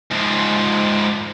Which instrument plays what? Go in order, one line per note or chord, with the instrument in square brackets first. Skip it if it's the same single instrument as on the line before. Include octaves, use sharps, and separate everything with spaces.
[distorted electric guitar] G#2 F3